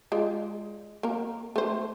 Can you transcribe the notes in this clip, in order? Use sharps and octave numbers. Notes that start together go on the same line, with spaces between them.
G#3 F4 D5
A#3 A#4
A3 C5